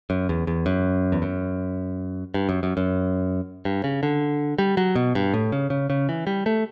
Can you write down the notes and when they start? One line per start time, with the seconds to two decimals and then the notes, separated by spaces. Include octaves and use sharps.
0.10 F#2
0.29 E2
0.47 E2
0.66 F#2
1.12 E2
1.22 F#2
2.34 G2
2.49 F#2
2.63 F#2
2.77 F#2
3.65 G2
3.84 C#3
4.03 D3
4.58 G3
4.77 F#3
4.95 B2
5.15 G2
5.34 A2
5.52 C#3
5.70 C#3
5.90 C#3
6.09 E3
6.27 G3
6.46 A3